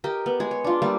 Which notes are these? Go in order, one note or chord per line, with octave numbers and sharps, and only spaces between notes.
G4 A#4 D#5
B3
G#3 G#4
C#5
D4 F4
G3 A#3 E5 F5